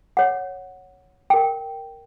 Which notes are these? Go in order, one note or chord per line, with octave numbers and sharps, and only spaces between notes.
C#5 F#5
A#4 G5